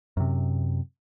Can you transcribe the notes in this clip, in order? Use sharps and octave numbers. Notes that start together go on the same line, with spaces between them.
F#2 C3